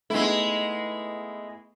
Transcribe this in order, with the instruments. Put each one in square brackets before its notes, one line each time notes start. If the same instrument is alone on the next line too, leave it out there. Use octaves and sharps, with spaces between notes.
[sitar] G#3 E4 [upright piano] A3 B3 D#4